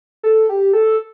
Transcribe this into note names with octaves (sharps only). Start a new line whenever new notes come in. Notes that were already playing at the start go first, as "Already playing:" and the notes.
A4
G4
A4